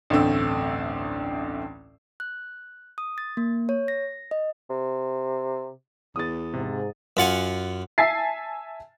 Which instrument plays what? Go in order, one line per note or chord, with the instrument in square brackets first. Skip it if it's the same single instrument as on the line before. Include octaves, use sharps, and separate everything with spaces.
[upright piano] A1 D2 G2 A3 C4 E6
[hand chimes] F#6
D#6
A6
A#3
C#5
A#6
D#5
[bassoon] C3
[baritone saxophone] E2 [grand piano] D#6 A6
[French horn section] G#2 [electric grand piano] C3
[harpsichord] F#2 F4 F#5 G#5
[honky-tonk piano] E5 G#5 A5 A6 C7